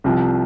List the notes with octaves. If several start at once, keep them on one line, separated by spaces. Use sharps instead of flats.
C2 C3 F3